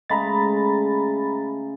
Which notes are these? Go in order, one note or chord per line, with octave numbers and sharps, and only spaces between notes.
C#3 G#3 A3 A#5 B5 A6